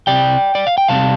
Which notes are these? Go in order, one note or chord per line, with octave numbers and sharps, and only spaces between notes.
C2 C3 G3 D5 G5
D5
F5
G5
C2 C3 G3 C4 F5 A5